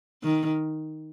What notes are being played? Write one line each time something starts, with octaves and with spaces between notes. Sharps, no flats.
D#3